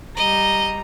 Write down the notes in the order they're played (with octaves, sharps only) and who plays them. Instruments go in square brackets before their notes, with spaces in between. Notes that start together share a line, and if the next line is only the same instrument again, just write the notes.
[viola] G3 A#5 [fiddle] D#5